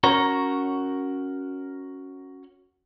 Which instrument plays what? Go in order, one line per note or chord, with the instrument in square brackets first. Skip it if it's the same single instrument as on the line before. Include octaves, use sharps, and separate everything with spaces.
[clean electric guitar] C#4 F#4 A#4 C#5